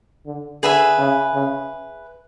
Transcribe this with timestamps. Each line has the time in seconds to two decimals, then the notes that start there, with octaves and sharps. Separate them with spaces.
0.26 D3
0.63 D3 G#4 B4 E5 G#5
0.99 C#3
1.34 C#3